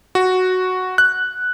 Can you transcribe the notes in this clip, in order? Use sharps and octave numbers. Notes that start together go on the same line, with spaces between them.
F#4
F#6